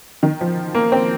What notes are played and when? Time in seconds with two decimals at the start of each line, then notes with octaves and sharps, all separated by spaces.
0.23 D#3
0.41 F3
0.75 A#3
0.92 C4